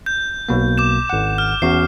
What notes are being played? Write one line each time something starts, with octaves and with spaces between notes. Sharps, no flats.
G6
B1 B2 A#3
D6 G6 E7
G#1 F#5
F6
E2 C#4 F#4 C7